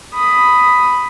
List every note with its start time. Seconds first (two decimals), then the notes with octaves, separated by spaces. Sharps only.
0.14 B5 D#6